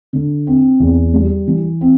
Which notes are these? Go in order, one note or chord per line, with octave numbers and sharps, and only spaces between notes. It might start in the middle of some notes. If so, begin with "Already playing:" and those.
D3
C4
E2
G3
E3
C4